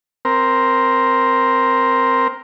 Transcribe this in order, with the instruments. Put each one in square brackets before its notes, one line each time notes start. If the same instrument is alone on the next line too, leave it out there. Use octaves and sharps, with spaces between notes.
[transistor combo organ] C4 A#4